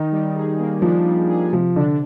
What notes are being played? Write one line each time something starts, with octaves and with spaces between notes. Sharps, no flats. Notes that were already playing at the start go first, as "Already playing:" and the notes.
Already playing: D#3 D#4
G3
G#4
A#3
F3 D4
G3
G#4
C3 F3
D3 D4